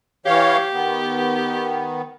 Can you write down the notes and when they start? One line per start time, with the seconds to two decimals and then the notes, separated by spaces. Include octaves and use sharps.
0.26 E3 G4 C#5 F5
0.73 D#3 B3